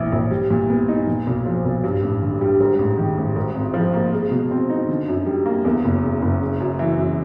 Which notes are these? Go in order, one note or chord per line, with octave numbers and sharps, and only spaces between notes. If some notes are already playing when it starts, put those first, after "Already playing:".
Already playing: A#1 A2 E3
A#1
G3
A#2
B3
D#4
A#2
B1
F3
B1
G2
A1
D3
G3
G#2
A1
D#3
A1
G#2
G#1
F3
A#3
G#3
B2
C4
D#4
D3
F#2
G3
A#3
E2
F#1
C#3
F#1
C#3
F#2
E3
F#2